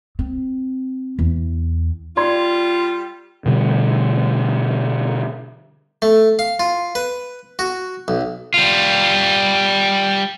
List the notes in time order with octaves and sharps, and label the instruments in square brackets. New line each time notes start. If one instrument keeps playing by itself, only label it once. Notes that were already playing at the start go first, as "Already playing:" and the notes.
[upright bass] C4
E2
[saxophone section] G3 F4 [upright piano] D5 C6 G#6
[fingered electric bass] B2 D3 G3
[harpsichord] A3
F5
F4
B4
F#4
B1
[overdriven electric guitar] G3 F4